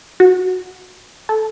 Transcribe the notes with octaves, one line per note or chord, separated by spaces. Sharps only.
F#4
A4